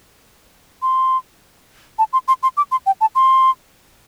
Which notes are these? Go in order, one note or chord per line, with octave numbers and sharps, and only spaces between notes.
C6
A5
C6
C6
C6
D6
C6
G5
A5
C6